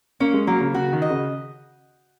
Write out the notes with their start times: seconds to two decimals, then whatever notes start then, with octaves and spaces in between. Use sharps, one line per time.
0.20 A#3 C#4
0.34 G#3
0.47 F#3 A#3
0.61 C#3
0.74 C#3 F#4
0.92 D#3
1.02 D#5
1.10 C#3